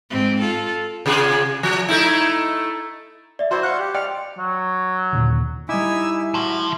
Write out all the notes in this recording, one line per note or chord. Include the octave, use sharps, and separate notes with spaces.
G#2 C4
F4 A4
C3 F4 G#4
F3
A3 D#4 E4
D5 E5
E4 F#4 C5 D5 C6
F5 F#5 C#6 F#6
G4
D5 G5 C6 F6 C#7
F#3
D#2 A#2 D3
G3 D#4 E4 G#5 D6 E6
F#4 A5 C6